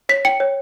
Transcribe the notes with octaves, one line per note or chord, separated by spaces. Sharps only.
C#5 B6
G5 C#7
C#5